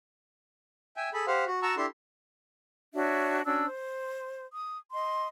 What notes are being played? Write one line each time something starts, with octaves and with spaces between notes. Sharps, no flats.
E5 G5 G#5
G#4 A4 B5
G4 C5 F5 F#5
F#4
F#4 F#5 A5 A#5 C#6 E6
D4 E4 G4 A4 C6
D4 F#4 C#5 E5
C#4 D4 F#4 E6
C5
D#6
D#5 C6